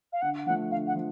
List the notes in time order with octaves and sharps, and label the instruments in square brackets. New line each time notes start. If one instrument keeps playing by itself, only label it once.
[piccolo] F5
[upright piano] D3 [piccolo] F#5
[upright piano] F3 [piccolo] F#5
[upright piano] A3
[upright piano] D3 [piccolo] F5
[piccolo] F#5
[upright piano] F3